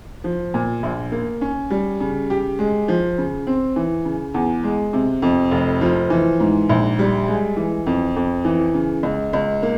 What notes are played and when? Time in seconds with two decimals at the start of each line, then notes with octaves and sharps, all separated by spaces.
0.24 F3
0.54 A#2
0.83 A#1
1.12 A#3
1.41 C#4
1.70 G3
2.00 C#3
2.30 G4
2.59 G#3
2.88 F3
3.18 C#3
3.47 C4
3.76 E3
4.05 C#3
4.34 E2
4.63 G#3
4.93 C3
5.22 F2
5.51 F1
5.81 F3
6.10 E3
6.40 G#2
6.70 A#1
6.99 G3
7.27 G#3
7.57 E3
7.86 F2
8.16 F2
8.45 E3
8.74 C#3
9.03 C#2
9.33 C#2
9.63 A#3